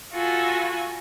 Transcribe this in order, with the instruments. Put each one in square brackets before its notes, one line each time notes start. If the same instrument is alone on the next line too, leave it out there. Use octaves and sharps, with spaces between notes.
[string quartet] F4 F#4 A4 G#5 B5 A#6